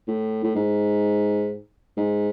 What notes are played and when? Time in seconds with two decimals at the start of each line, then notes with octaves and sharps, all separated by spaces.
0.07 A2
0.44 A2
0.56 G#2
1.97 G#2